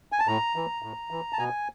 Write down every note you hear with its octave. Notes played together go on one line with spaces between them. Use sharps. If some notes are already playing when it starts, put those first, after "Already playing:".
G#5
A5
A2 A#5
E3
A2
E3
A5
B2 G#5